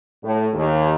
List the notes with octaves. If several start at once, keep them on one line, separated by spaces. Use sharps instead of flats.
A2
D#2